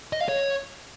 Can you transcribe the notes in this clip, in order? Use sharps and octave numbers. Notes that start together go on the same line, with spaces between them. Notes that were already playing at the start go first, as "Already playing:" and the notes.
D#5
F5
C#5